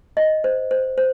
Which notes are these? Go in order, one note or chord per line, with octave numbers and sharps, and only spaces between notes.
D#5
C5
C5
C5